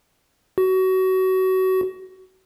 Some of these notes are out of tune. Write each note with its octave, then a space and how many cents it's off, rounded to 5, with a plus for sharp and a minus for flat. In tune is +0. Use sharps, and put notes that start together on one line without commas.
F#4 +25